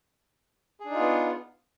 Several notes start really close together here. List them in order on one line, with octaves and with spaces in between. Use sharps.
G#4 D4 D#4 F4 B3